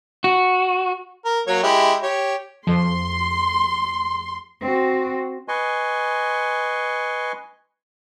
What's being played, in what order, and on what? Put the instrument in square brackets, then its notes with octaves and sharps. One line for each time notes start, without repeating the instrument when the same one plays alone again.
[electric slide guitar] F#4
[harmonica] A#4
F#3 A#3 C#5
G#3 E4 G4
G4 C#5
[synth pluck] F2 F3 [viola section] C6
[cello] C4 F#4
[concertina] B4 D#5 G#5 C6 C#6